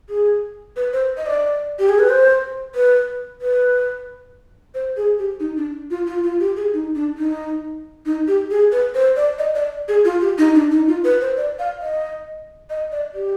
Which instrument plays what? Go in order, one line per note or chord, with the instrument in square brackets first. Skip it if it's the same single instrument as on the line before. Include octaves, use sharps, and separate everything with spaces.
[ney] G#4
B4
C5
D#5
D5
G4
G#4
B4
C5
B4
B4
C5
G#4
G4
D#4
D4
F4
F4
F4
G4
G#4
D#4
D4
D#4
D#4
G4
G#4
B4
C5
D5
D#5
D5
G#4
F4
G4
D#4
D4
D#4
F4
B4
C5
D5
F5
D#5
D#5
D5
G4